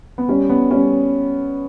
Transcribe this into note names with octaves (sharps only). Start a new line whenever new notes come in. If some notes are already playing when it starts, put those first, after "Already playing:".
B3
G3 C#4
B3
G3 C#4